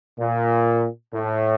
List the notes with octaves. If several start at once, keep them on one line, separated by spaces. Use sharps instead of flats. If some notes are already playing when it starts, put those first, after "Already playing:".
A#2
A2